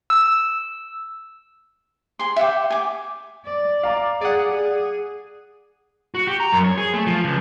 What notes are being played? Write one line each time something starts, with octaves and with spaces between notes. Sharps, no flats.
E6
G#4 C6
E5 F#5 G5 D6
G#5 D6
D5
F5 A#5 D6
G#4 D5 F#5
G#4
F#4
G4
A#5
F#2
C#5
G#4
A3
F3
C#2